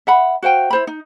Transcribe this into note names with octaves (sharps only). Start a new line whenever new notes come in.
E5 F#5 B5
F#4 C5 F5 G5
E4 C5 B5
D#4